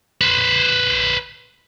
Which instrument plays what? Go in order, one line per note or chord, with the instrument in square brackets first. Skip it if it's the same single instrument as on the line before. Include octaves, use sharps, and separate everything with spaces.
[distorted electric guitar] B4 C5